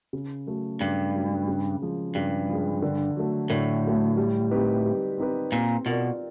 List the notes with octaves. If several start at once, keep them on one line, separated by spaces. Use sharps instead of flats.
C#3
F#3 A3
G2 C#3
F#3 A3
C#3
F3 G#3
G2 C#3
F3 G#3
D3
F#3 A3
A2 D3
F#3 A3
G3
C4 D#4 G4 B4
G3
C4 D#4 G4 B4
A#2 C4
B2 F4 A#4 D5